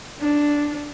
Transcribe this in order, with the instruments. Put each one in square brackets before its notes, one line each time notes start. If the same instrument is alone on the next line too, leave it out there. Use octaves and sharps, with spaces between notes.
[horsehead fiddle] D4